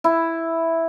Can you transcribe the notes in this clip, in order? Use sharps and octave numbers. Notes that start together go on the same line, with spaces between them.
E4